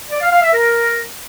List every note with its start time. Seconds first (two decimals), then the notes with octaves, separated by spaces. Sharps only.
0.10 D5
0.21 F5
0.31 F5
0.42 E5
0.53 A#4